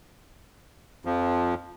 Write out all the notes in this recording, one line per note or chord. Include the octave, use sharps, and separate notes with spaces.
F2 F3